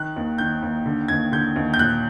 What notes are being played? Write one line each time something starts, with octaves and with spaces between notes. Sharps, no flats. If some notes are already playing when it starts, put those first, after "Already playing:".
Already playing: D#3 F#6
D#2
D#3 G6
D#2
D3
D#2 G#6
D3 G6
D#2
G6
A#2 F#6